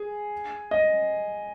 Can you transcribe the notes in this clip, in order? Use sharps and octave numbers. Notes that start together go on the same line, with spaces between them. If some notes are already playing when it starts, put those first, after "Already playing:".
Already playing: G#4
D#5